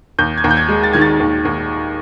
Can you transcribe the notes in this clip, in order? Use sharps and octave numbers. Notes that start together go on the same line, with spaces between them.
D#2 G6
G#6
D#2
G6
G#6
G#3
A6
D#3 G#6
A6
D#2
D#2